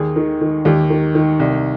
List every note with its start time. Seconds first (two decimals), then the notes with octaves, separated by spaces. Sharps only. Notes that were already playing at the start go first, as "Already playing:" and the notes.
Already playing: D#2 G#4
0.16 D#3
0.41 D#3
0.65 D#2 G4
0.90 D#3
1.15 D#3
1.40 C2